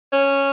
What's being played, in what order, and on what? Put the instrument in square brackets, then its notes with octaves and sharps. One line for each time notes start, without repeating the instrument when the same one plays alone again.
[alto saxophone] C#4